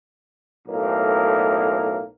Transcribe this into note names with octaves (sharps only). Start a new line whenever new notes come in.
B1 A2 A#3 A#4